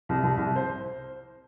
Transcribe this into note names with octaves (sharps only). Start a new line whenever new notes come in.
C2
C2
C2
C5